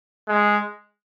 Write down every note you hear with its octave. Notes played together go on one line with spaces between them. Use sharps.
G#3